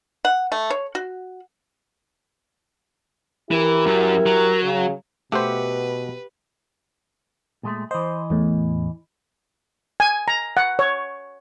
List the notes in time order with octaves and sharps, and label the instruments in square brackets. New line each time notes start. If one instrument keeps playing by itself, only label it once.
[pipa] F#5
A3
C#5
F#4
[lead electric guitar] E3 [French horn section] E4 G4 A#4
[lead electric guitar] F#2 F#3
F#3
[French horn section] C#3
[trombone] B2 [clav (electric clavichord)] A3 C5 [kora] G4 E5 F#5 [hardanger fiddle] B4
[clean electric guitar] A#2 G#3 A3
[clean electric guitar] E3 D#5 [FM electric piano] C5
[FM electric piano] E2 A2
[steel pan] G#5
A#5
F#5
C#5